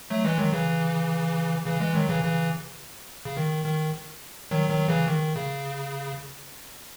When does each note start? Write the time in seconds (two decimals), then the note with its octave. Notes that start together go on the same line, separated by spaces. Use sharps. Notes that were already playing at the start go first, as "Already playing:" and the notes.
0.10 F#3 A3
0.25 E3 G#3
0.38 D#3 F#3
0.52 C#3 E3
1.66 C#3 E3
1.80 E3 G#3
1.94 D#3 F#3
2.09 C#3 E3
2.24 C#3 E3
3.25 C#3
3.37 D#3
3.65 D#3
4.51 D#3 F#3
4.70 D#3 F#3
4.88 C#3 E3
5.07 D#3
5.36 C#3